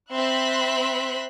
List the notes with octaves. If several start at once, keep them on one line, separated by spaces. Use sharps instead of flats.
C4 E5 B5 C6 F#6